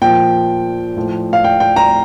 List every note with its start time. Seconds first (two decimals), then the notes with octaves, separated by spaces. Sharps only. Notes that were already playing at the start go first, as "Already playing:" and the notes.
0.02 A#2 F3 G5
0.96 A2 F3
1.33 F5
1.44 G5
1.60 G5
1.76 A#5